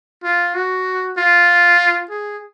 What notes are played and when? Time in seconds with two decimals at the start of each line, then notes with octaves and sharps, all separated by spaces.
0.24 F4
0.55 F#4
1.17 F4
2.10 G#4